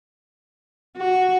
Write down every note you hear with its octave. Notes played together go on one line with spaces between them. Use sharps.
F#4